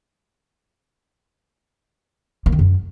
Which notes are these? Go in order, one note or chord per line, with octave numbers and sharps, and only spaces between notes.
A#3
D#3
F#2